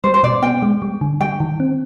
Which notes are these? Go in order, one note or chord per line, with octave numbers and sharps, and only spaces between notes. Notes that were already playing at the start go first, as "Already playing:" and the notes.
G3 C5
C5
B2 D5
B3 G5
G#3
G3
D3
G3 G5
D#3
C4